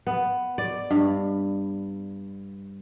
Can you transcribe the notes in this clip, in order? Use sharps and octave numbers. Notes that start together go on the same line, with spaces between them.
B3
D5
G2